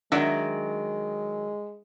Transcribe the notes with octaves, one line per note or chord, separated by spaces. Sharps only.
D#3 F#3 G#3 D4 F#4 D5 E5